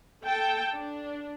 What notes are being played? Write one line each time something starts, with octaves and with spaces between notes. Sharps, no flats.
A4 G5 A5
D4